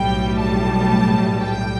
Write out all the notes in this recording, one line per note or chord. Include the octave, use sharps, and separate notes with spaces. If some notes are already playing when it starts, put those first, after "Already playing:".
Already playing: B1 A2 G3 G5
A5
G5